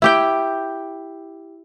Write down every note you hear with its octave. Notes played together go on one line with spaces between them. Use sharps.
E4 G4 G5